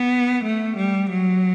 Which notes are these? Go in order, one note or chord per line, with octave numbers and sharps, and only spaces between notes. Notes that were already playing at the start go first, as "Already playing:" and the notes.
Already playing: B3
A3
G3
F#3